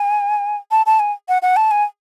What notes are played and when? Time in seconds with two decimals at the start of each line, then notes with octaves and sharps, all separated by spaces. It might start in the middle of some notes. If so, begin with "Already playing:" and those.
Already playing: G#5
0.71 A5
0.86 A5
0.99 G#5
1.29 F#5
1.42 F#5
1.56 A5
1.71 G#5